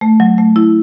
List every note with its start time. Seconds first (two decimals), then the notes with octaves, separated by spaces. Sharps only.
0.01 A3
0.20 F#3
0.38 A3
0.56 E4